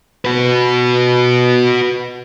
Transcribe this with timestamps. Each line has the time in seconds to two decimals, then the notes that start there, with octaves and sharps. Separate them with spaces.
0.25 F#4 B4